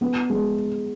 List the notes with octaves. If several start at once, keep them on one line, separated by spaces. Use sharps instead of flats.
B3
G#3